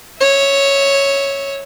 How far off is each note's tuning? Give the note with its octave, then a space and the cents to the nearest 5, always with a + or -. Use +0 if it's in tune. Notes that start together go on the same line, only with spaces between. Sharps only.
C#5 +0 E5 -15